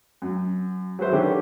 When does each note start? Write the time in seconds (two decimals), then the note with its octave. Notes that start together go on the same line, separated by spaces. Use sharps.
0.22 F#2
0.99 F#3 G#3 B4 C5 E5
1.12 D3 D#3 C#4 G4 B4